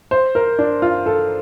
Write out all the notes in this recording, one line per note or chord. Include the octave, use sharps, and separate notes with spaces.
C5
A#4
D4
F4
A4